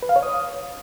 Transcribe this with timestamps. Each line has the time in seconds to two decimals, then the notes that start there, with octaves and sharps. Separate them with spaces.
0.02 B4
0.09 F5
0.16 C#5
0.23 D#6